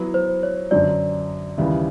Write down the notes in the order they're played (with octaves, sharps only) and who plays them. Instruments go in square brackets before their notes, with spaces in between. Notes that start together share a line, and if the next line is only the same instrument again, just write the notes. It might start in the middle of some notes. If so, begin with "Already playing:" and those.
Already playing: [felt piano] F#3 B3 E4 [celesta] B4
[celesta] C5
C#5
[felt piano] F#2 D3 F#3 [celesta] D5
[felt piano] D#2 C#3 E3 G3